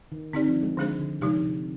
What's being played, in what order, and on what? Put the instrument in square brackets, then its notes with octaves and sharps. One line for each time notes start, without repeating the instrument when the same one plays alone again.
[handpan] D#3
[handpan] D3 [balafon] C4 D#4 G4 D5
[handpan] F3
G#3
[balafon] D3 G#3 D4 G#4 C5 [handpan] F3
[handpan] D3
[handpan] C3 [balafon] F3 G#3 D#4 G4
[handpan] C3